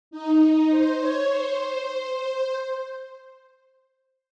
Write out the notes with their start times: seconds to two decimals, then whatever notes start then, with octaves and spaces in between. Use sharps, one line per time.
0.11 D#4
0.70 C5
0.99 C#5
1.29 C5